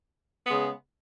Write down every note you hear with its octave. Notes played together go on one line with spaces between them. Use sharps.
C#3 G#3 B3